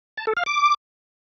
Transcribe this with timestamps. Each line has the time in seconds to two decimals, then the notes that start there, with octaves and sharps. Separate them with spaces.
0.17 A5
0.27 A4
0.37 F5
0.46 D6